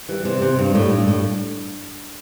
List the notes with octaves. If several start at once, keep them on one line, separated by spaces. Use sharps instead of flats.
E3 G3
C3 E3
C3
G2
A2
G2
A2